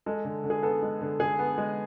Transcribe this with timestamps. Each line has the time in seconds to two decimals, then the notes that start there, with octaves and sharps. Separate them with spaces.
0.06 G#3 A4
0.25 D3
0.44 D3
0.50 G#4
0.63 B3 A4
0.83 G#3
1.01 D3
1.19 D3 G#4
1.39 B3
1.58 G#3